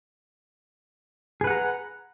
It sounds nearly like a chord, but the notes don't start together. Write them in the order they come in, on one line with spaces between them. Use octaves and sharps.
G#4 B4 F#5 A#5